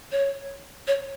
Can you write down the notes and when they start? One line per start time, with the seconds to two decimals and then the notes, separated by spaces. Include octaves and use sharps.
0.12 C#5
0.87 C#5